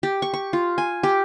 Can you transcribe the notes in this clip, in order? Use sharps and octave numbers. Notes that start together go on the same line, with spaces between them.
G4
C#6
C#6
F4
G#5
G4